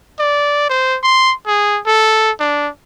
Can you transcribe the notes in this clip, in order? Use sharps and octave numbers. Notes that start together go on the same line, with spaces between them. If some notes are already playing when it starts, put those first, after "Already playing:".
D5
C5
C6
G#4
A4
D4